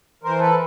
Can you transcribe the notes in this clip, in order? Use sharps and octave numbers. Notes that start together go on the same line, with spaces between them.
E3 A#4 C5
A4 B4